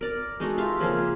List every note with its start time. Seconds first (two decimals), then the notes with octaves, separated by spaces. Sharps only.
0.01 A#4 D5
0.40 G#3 D#4 F#4 A4
0.58 F4 G4 E5 F5
0.80 C#3 F3 A#3 C#4